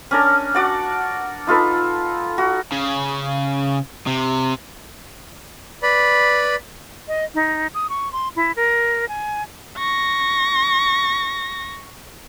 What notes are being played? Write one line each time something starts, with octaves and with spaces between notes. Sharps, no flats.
C#4 D4 A#4
F#4 D5 F#5
D#4 F4 A4 B4
F#4
C#3
C3
B4 D5 B5
D#5
D#4
D#6
C#6
C6
E4
A#4
G#5
C#6 A#6